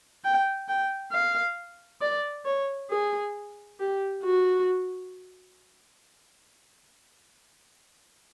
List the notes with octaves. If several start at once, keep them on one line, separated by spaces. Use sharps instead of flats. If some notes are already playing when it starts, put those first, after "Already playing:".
G5
G5
F5
D5
C#5
G#4
G4
F#4